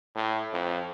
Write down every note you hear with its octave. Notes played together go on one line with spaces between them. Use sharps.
A2
F2